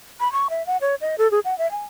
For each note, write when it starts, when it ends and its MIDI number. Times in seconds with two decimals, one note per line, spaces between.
0.20 0.31 83
0.33 0.48 85
0.50 0.65 76
0.67 0.77 78
0.81 0.95 73
1.01 1.16 75
1.18 1.30 69
1.31 1.40 68
1.45 1.57 78
1.58 1.70 76
1.71 1.85 80